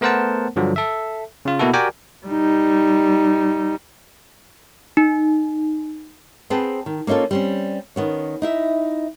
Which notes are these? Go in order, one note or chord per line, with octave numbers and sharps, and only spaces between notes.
A3 B3 A#4 C5 F#5 A5
G2 D3 F3 F#3
A4 E5
C#3 F4
B2 A#3 B3 E4 F#4 A4
F#4 G4 A#4 D5 G5 G#5
G3 D#4
D#4
B3 C4 G#4 B4 G5 A5
D#3
A#3 C#4 D#4 F4 A4
G3 C4 C#4
D#3 B3 C#4
D#4 E4 E5